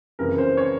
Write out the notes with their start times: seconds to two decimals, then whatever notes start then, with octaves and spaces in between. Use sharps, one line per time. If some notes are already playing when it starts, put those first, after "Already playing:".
0.19 F#1 F2 C#3 E3 A#4
0.38 C5
0.57 C#5